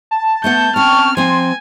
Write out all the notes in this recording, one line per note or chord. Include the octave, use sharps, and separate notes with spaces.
A5
A3 B3 F#5 G6
C4 C#4 G5 C#6 F6
F3 C4 G#5 C6